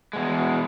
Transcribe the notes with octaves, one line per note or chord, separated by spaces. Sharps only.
E2 B2 G#3